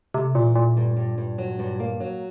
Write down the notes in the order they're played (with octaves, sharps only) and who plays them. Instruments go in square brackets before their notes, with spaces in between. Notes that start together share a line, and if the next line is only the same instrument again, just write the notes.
[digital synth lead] C3 [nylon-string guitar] A3
[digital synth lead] A#2 [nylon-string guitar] E3
[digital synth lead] A#2 [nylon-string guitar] A3
[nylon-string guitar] G2
G2
G2
F#3
G2
A#3
F#3